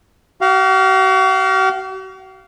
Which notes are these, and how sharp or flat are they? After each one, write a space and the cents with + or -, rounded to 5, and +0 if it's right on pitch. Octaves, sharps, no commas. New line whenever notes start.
F#4 +45 F5 +0